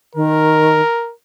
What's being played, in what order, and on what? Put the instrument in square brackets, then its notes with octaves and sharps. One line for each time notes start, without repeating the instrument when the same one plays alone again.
[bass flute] D#3 [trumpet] A#4